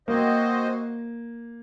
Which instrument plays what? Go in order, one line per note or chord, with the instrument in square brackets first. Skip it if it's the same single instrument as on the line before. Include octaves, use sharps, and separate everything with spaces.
[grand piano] A#3 [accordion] C4 F#4 C5 D#5